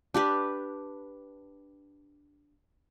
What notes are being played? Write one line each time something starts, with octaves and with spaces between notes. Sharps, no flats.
D4 G4 B4